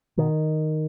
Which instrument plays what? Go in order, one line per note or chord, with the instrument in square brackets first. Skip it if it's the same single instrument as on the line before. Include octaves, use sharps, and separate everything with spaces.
[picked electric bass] B2 D#3